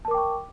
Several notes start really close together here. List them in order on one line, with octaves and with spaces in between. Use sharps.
A5 A#4 D6 G5 C#6